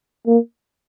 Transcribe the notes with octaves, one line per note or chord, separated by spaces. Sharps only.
A#3